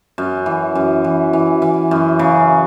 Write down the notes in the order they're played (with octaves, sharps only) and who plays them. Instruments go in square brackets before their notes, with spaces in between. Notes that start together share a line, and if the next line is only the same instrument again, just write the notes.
[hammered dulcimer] F#2
E3
F#2
E3
E3
E3
F#2
C#3